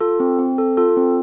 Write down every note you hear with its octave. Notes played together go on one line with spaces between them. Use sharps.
F4 A4
C4
C4
A4
F4 A4
C4